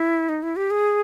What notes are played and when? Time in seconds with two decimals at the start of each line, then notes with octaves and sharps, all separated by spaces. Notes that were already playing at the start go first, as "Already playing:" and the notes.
Already playing: E4
0.29 D#4
0.43 E4
0.56 G4
0.71 G#4